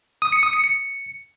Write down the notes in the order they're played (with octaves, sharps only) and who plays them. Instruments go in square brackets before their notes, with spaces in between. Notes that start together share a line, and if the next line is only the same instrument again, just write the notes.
[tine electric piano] D#6
C#7
D#6
C#7
C#7